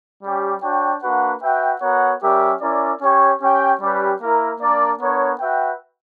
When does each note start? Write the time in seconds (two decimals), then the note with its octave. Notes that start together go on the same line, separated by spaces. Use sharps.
0.23 G3 C#4 G4
0.62 D4 F#4 C#5 G5
1.03 A#3 D4 F#4 B4 F#5
1.43 F#4 B4 E5 G5
1.82 B3 F#4 A#4 C#5 F#5
2.23 G3 C#4 G4 A#4 E5
2.61 C#4 E4 A#4 D5
3.01 C#4 G4 C#5 G5
3.41 C#4 G4 C#5 G5
3.81 G3 C#4 G4 B4
4.22 A#3 E4 A#4
4.61 A#3 D4 A#4 D5
5.00 B3 D4 A#4 C#5
5.40 F#4 B4 E5 G5